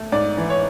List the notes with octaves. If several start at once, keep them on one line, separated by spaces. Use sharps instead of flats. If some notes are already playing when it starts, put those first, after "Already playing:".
Already playing: A3
G#2 D5
E3
C#5